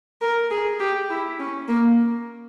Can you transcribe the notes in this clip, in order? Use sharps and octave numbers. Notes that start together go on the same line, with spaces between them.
A#4
G#4
G4
E4
C#4
A#3